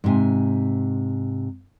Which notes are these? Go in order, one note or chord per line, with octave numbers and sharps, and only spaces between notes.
G#2 C3 G#5